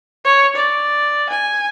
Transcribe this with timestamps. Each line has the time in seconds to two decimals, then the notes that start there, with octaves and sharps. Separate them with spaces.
0.25 C#5
0.56 D5
1.29 G#5